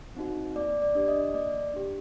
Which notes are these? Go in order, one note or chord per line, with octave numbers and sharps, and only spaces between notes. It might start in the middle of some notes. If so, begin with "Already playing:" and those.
C4 D#4 F#4
A#3 D5
D5
D4 G4
D#5
A#3 D5
D4 G4